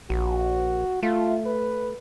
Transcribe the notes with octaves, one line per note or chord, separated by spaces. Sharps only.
A#1 F#4
A3 F4
B4